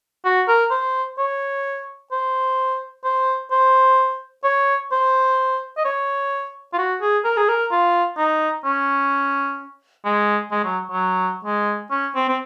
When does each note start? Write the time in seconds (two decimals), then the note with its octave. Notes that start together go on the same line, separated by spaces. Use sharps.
0.25 F#4
0.48 A#4
0.71 C5
1.18 C#5
2.12 C5
3.04 C5
3.51 C5
4.44 C#5
4.92 C5
5.77 D#5
5.85 C#5
6.74 F4
6.78 F#4
7.02 G#4
7.24 A#4
7.37 G#4
7.49 A#4
7.71 F4
8.17 D#4
8.65 C#4
10.05 G#3
10.52 G#3
10.65 F#3
10.91 F#3
11.45 G#3
11.91 C#4
12.15 C4
12.29 C4